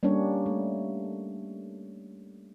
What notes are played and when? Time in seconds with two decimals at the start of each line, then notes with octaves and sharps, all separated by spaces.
0.03 G3 A#3 C#4 D4 C#5
0.46 A3